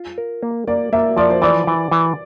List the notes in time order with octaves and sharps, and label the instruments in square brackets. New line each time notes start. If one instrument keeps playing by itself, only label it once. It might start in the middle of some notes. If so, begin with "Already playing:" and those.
Already playing: [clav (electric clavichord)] F4
A#4
A#3
[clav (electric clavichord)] A#3 [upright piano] D5
[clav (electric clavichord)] A#3 [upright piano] E5
[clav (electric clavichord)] F3 [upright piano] D5
[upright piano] C5
[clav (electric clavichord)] E3 [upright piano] D5
[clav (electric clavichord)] E3
E3